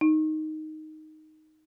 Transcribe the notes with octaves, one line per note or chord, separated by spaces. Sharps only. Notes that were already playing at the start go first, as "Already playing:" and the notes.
D#4